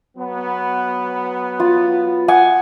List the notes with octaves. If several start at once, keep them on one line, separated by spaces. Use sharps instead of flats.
F#3 B3
F4
F#5 G#5 D#6